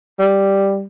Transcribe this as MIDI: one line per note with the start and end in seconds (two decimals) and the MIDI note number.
0.19 0.85 55